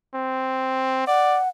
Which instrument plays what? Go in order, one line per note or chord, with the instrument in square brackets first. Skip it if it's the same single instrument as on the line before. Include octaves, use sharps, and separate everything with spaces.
[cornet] C4
[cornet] D5 [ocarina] F#5